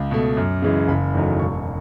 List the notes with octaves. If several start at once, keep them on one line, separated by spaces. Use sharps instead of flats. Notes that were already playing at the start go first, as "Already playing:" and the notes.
Already playing: C#2
B2 A3
F#2
C#3 E3 G#3
F#1 B5
E2 D#3 F#3 A3
E1 C#6